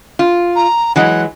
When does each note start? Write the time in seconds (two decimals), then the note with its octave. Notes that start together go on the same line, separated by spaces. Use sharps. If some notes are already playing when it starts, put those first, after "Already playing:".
0.19 F4
0.56 A#5
0.96 E3 F#3 G#3 F#5